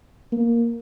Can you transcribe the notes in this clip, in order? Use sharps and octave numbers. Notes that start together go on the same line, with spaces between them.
A#3